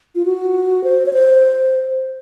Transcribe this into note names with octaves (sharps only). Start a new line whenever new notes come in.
F4
F#4
C5
C#5
C5